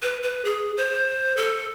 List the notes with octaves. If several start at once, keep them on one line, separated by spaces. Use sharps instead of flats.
B4
B4
G#4
C5
A4